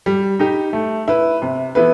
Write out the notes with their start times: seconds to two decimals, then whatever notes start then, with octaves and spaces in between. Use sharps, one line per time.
0.06 G3
0.39 D#4 G4
0.73 A3
1.08 E4 B4
1.42 C3
1.75 E3 B3 E4 B4